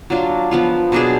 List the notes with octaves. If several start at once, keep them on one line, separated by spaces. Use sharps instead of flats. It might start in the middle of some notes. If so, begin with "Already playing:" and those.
F#3 D4 F4
F3 B3 F4
B2 F#3 D4 G#4